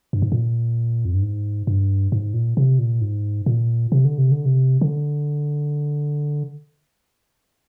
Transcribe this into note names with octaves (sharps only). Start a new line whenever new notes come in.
G2
G#2
A#2
F2
G2
G#2
G2
G#2
A#2
C3
A#2
G#2
A#2
C3
D3
C3
D3
C3
D3